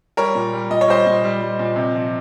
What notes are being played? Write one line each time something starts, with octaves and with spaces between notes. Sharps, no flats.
G3 A#4 C#5
A#2
G3
A#2 D#5
C#5
G3 C5 D#5
A#2
G3
G3
A#2
C3
F3